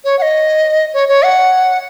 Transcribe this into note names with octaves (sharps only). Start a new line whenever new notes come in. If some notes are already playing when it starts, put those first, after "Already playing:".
C#5
F#5
D#5
C#5
C#5
F#5